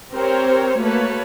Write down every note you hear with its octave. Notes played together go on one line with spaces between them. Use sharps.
C4 G4 A#4 C5 C#5
A3 A#3 F#4 B4 C#5 A5